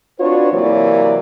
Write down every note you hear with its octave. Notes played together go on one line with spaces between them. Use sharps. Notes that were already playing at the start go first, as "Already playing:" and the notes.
C4 D4 F4 F#4 B4 C#5
C3 E3 F#3 A#3 C#5 D5